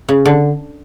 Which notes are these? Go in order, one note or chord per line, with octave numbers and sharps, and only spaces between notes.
C#3
D3